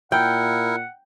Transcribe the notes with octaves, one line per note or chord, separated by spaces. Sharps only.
A#2 E4 A#4 F#5 G5